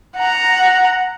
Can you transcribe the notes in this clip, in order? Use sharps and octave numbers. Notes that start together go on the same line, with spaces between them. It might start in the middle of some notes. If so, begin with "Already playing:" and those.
F#5 A#5